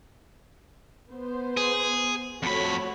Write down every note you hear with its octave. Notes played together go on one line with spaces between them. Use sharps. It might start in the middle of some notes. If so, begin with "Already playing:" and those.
B3 C5
G#4
F2 A3 F#4 C#5 B5